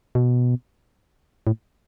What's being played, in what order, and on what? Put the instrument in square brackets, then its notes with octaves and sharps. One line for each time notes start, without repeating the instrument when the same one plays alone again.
[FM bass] B2
A2